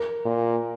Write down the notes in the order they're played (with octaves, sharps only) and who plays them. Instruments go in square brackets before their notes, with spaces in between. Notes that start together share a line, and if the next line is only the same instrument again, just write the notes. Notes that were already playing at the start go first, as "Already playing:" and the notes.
Already playing: [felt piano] A#4
[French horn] A#2